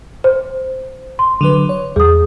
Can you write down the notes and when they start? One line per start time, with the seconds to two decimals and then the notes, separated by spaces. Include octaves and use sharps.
0.24 C5
1.19 C6
1.41 D3 F#3 B4
1.69 C#5
1.96 E2 G3 G#4 D#6